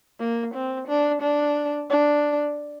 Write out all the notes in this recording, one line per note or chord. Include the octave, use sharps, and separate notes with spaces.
A#3
C4
D4
D4
D4